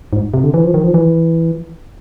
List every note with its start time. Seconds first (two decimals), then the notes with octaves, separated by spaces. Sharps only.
0.13 G#2
0.34 C3
0.44 D3
0.54 E3
0.64 F3
0.74 D#3
0.84 F3
0.94 E3